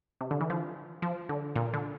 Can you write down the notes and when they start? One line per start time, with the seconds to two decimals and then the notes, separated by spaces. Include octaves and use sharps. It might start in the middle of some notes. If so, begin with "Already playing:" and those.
0.21 C3
0.31 D3
0.41 E3
0.50 F3
1.02 F3
1.29 D3
1.56 A#2
1.74 D3